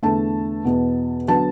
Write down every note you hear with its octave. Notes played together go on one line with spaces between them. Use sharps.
E2 D3 A3 A5
E2 B2 B3
D3 F#3 B3 A5